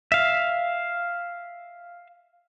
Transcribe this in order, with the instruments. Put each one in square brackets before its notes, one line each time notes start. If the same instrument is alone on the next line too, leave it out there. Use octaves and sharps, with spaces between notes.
[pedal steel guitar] E5 F5